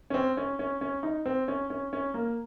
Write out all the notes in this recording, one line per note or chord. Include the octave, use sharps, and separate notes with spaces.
C#4
C4
C#4
C#4
C#4
D#4
C4
C#4
C#4
C#4
A#3